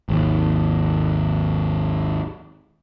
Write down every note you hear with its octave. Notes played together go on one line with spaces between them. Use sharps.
G#1 D#2